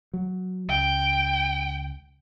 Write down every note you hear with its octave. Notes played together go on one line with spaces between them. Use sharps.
F#3
C#2 G5